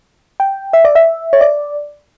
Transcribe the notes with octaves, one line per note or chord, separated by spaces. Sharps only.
G5
E5
D5
E5
C#5
D5